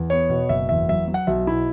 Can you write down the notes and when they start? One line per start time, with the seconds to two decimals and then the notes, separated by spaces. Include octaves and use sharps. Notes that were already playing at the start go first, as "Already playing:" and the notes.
Already playing: E2
0.10 B3 C#5
0.29 B2
0.49 F#1 E5
0.69 E2 E5
0.89 F#3 E5
1.08 F#3
1.14 F#5
1.27 B1 E5
1.47 B2 E4